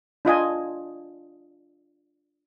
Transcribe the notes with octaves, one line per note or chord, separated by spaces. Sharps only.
D4 F4 D#5 G#5